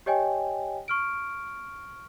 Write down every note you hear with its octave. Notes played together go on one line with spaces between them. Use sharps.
G4 C#5 D#5 G5 G#5
C#6 F6 D7